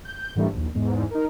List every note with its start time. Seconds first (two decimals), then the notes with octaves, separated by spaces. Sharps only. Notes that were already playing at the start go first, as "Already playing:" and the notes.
0.05 G6
0.36 G#2 D3 E3 G3 A3 A#3
0.53 A#1 D#2
0.74 E2 G#2
1.11 D#4 A#4